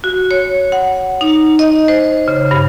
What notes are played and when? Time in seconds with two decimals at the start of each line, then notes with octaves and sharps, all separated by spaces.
0.04 F#4
0.31 C#5
0.72 F#5
1.21 D#4
1.59 D#5
1.88 C5
2.28 C#3
2.51 G2